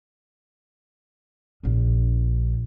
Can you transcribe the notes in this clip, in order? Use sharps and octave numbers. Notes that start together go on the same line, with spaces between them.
A#1 D4